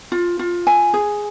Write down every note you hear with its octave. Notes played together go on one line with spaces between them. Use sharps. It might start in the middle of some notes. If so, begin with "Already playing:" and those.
F4
F4
G#5
G#4